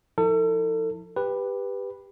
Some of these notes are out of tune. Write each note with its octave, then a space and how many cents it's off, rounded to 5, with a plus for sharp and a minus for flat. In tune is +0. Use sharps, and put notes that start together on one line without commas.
F3 +0 E4 -35 A4 +40
G4 +15 B4 +0